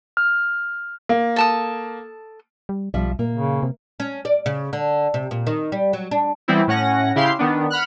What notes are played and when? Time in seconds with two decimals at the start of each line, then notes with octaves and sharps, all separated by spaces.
0.17 F6
1.09 A#3
1.36 A4 A5 D#6
2.69 G3
2.94 B1 F3 G3 E5
3.19 A#2 A#3
3.35 C#3
3.63 C3
4.00 C#4
4.25 D5
4.46 C#3
4.73 D3
5.14 C3
5.31 A#2
5.47 D#3
5.72 G3
5.93 F#3
6.11 D4
6.48 E3 G3 B3 C4 E4
6.67 A2 C#4 F#5 A#6
7.16 C#3 E4 G4 F5 C6 C7
7.39 D#3 B3 D4
7.70 F#5 B5 F6 F#6